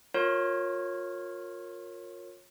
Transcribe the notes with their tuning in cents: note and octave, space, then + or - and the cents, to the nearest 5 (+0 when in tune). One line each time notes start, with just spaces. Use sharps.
F4 +30 A#4 -5 C#5 -15